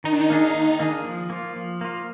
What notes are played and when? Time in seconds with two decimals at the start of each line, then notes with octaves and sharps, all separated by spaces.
0.04 D#3 D#4
0.12 D4
0.21 D#4
0.30 A#3 D4 G#4
0.54 D#3
0.79 A#3 D4 G#4
1.05 F3
1.30 A#3 F4
1.56 F3
1.81 A#3 F4